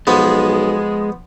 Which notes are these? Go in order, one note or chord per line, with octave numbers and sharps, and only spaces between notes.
B1 F3 G#3 B3